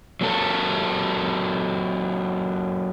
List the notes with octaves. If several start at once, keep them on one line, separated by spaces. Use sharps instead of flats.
F#3 A#3 A4 A#4